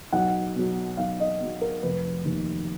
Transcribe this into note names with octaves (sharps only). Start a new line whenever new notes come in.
B1 F#5
B2 F#3
B1 F5
D#5
B2 F#3
A#4
F1 B4
D#2 D#3